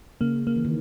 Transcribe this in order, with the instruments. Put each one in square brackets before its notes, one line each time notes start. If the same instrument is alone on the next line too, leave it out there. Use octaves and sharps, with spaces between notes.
[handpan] C#3 [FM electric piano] A#3
[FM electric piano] A#3
[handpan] E3
D#3